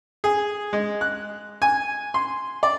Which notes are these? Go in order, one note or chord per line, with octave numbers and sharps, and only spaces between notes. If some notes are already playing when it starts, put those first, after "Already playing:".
G#4
G#3
F#6
G#5
C6
D5